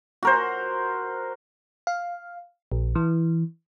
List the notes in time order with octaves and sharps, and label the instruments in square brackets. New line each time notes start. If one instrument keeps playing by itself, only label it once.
[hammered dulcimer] F#4 A#4 C5
[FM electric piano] F5
A#1
E3